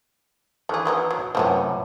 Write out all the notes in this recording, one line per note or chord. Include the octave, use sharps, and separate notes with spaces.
D#3 E3 A3 G#4
F#3 B3 D#4
F#3
F#2 A2 C3 F3 A#3 B3